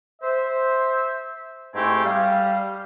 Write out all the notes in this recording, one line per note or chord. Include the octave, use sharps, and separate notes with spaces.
C5 E5
G#2 A3 C4 E4 G4 G#5
G3 F5